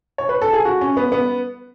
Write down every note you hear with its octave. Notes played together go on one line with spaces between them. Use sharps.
C#5
B4
A4
G#4
F#4
C#4
B3
B3